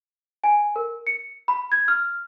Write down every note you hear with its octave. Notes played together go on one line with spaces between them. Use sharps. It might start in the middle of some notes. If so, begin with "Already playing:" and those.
G#5
A#4
C#7
B5
G#6
F6